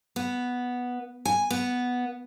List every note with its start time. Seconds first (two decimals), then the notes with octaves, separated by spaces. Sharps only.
0.16 B3
1.25 G#5
1.50 B3